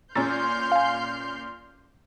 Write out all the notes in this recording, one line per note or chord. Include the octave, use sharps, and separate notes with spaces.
A#2 C#4 A#5 C6 E6 F6 G6 A6
F5 G#5